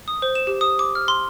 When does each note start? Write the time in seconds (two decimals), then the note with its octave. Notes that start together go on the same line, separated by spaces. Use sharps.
0.08 D#6
0.22 C5
0.35 E7
0.47 G4
0.61 D#6
0.79 D6
0.95 F6
1.08 C6